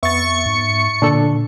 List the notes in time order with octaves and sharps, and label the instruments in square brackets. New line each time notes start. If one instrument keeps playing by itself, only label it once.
[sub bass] F2 [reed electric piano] B3 [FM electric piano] E5 A6 [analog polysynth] C#6 C#7
[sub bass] G#2
[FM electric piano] A#2 [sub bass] D3 [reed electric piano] D4 A4